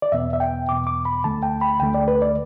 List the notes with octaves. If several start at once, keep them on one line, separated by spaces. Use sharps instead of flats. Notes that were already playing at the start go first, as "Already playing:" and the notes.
D5
E2 B2 B3 E5
E5
G5
E2 B2 B3 D6
D6
B5
D2 D3 A3 A5
G5
B5
D2 D3 A3 G5
D5
B4
D5